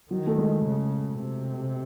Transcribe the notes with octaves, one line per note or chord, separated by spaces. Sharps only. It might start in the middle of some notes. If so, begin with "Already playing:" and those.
D#3 F#3
A3
G#3
C#3
C3